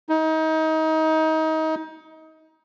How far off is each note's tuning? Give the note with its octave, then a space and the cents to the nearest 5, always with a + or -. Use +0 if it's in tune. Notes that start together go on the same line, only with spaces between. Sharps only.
D#4 +30